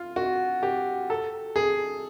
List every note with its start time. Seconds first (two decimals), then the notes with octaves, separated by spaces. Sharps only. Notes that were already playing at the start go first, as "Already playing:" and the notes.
Already playing: F4
0.16 F#4
0.63 G4
1.10 A4
1.56 G#4